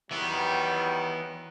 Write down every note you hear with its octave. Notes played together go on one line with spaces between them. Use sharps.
D#3 E3 F#3 G3 B3